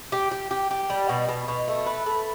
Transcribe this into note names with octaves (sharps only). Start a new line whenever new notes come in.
G4
G4
G4
G4
G3
B2
B2
B2
A3
B4
A3